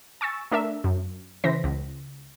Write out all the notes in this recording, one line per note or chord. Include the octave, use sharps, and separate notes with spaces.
G#5 C#6 E6 A6
A3 D4 A#4 E5
F#2
C#3 E3 C5 A#6 B6
C#2